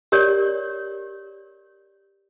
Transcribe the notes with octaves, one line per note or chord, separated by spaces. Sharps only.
G4 A#4 C#5 D5